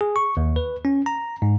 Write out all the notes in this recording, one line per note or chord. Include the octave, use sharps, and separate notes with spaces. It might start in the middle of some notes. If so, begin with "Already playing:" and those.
G#4
C#6
D#2
B4
C#4
A#5
G#2